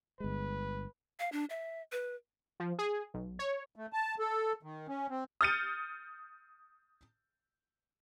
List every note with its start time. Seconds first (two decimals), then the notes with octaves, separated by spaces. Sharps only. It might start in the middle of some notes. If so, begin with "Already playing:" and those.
0.20 G1 G#3 B4
1.20 F5
1.32 D4
1.50 E5
1.92 B4
2.60 F3
2.79 G#4
3.14 B1
3.39 C#5
3.76 A3
3.93 A5
4.19 A4
4.63 D#3
4.88 C#4
5.10 C4
5.41 D#6 F6 G6 A6 C#7 D#7